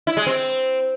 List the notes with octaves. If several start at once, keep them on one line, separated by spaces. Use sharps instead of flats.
E4
G#3
C4